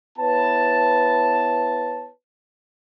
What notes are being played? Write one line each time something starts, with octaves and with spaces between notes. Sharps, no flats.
B3 E4 B4 C#5 A5